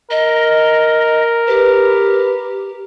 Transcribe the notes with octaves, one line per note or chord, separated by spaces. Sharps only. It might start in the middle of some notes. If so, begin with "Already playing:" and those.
A#4 D#5
G4 B4